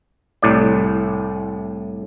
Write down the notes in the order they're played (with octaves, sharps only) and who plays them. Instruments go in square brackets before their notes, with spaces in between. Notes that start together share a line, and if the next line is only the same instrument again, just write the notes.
[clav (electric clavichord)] C2 A2 D5